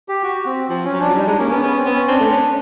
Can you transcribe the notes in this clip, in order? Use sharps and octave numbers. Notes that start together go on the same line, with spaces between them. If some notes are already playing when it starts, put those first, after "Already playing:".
G4
F#4
C4
F3 C4
C#4
F#3
F3 D4
F#3
G3 D#4
G#3 D4
A#3 C#4
B3 C#4
B3 C#4
C4
B3
C#4
C4 D4
A3
C#4